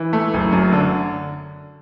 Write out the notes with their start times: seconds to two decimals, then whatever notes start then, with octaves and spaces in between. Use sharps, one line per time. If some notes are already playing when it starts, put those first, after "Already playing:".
Already playing: E3
0.13 A3
0.34 F#1
0.52 F#2
0.72 D3